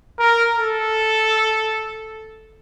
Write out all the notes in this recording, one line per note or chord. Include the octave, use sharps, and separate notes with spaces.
A#4
A4